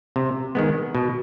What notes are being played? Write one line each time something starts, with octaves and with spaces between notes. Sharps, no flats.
C3
D#3 G#3 B3
B2